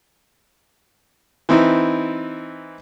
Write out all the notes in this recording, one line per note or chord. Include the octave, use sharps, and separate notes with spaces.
E3 C4 D#4 E4